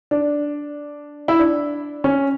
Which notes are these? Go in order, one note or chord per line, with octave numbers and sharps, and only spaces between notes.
D4
E4
D4
C#4